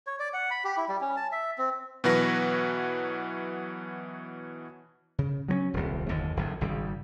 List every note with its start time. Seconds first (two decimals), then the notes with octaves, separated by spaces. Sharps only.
0.07 C#5
0.20 D5
0.34 F#5
0.51 B5
0.64 G4
0.77 E4
0.89 G3
1.01 C#4
1.17 A5
1.32 E5
1.58 C4
2.04 B2 E3 F#3 F#4 B4 A#6
5.19 C#3
5.48 F#3 B3 C#4
5.74 D#1 C2
6.09 F#1 D#2 D3
6.37 F#1 F#2 D3
6.61 G#1 C#3 G3